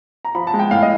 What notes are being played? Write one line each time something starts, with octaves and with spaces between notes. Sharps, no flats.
A#5
F3 B5
A5
G#3
G5
A2 F5
D#5